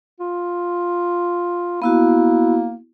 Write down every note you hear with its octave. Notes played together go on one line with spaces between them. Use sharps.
F4
A#3 B3 E4 F#4